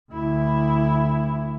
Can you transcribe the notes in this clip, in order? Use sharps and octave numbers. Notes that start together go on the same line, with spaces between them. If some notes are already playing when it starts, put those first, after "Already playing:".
D2 E4